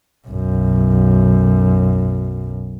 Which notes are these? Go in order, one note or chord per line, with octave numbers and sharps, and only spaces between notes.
B1 F#2